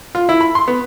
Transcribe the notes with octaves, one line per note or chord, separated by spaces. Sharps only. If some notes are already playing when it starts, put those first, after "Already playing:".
F4
E4
B5
C6
B3